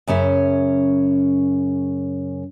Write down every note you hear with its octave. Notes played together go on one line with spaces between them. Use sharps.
F#2 C#3 C#4 E5